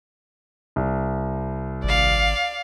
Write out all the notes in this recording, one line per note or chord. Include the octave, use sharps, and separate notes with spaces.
C2
G#1 D5 F5